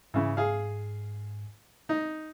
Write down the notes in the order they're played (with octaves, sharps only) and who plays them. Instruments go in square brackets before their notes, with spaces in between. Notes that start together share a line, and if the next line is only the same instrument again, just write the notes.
[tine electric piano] G#2 [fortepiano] C#3 E3
[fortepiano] G#4 F5
D#4